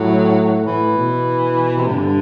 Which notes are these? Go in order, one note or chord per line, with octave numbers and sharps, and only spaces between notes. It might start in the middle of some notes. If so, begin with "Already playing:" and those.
Already playing: A2 F#3
A2 E3
B2
C3
G2 D3